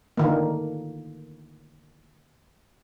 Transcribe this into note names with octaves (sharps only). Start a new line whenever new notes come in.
D3 D#3 A#3